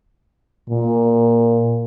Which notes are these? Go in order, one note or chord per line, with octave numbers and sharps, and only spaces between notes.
A#2